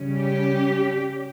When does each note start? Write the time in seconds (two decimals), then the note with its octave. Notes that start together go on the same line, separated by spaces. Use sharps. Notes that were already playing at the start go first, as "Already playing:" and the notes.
Already playing: C#3 G3 C#4
0.18 G4